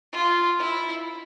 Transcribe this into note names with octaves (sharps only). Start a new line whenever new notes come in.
F4
E4